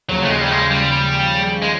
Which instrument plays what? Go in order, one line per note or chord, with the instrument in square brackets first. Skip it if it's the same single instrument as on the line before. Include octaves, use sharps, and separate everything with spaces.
[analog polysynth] D#2 C#3 F3 [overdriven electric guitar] F#3
[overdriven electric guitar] A3
G#3
G3
G#3
G3
G#3